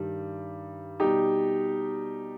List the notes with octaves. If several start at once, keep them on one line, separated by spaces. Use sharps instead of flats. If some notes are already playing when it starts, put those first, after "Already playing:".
Already playing: G2 D#3 G3
B2 G3 D#4 G4